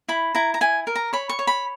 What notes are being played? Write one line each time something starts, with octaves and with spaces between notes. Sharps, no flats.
E4 B5
E4 A#5
A#5
E4 G#5
A#4
A#5
C#5 B5
C#6
C#5
B5